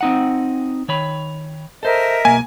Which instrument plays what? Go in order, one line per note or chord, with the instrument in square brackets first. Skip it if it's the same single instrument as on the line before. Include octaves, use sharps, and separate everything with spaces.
[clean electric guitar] C4 D#4 F#5
D#3 C#5 B5
[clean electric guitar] A4 C5 [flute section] A#4 D#5 E5
[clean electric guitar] B1 A#3 [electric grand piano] G#5